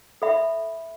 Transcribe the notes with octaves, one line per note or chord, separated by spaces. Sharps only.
A4 E5 B5